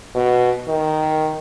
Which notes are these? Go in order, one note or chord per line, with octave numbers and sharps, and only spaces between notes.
B2
D#3